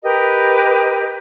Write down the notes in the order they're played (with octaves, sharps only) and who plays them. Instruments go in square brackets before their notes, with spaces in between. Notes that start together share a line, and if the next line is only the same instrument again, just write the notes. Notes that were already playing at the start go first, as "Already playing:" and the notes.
[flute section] G4 A#4 B4 D#5